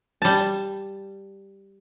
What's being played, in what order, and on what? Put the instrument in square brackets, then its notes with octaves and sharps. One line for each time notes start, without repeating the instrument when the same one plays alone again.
[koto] G3 A5